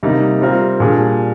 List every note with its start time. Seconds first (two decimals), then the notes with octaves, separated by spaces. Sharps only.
0.03 C3 G3 A#3 D#4
0.41 G3 C4 F4 A#4
0.80 A#2 G3 D4 G#4